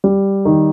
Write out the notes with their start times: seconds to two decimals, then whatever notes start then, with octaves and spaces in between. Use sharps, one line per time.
0.04 G3
0.45 D#3